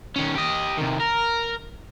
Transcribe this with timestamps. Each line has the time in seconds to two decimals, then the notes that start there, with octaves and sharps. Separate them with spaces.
0.16 D#3 C#4
0.35 G4 D#5
0.78 C3 D#3
1.01 A#4